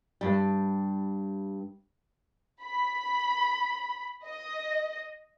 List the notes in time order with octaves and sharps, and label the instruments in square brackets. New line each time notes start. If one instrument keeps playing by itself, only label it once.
[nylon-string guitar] G2 G3
[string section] B5
D#5